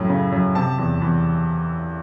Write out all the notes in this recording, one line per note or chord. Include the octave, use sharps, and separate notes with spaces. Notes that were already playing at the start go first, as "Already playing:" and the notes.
Already playing: F#2 A2
C#3
F#2
C3 A5
E2
E2